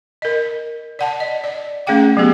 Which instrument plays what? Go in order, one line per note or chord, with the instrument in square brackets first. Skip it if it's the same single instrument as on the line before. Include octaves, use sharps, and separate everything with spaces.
[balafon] A#4 D#5
D5 F#5 A5
D#5
D5
A3 C#4 G#4 F5 G5 D6
F#3 A3 B3 G4 G#4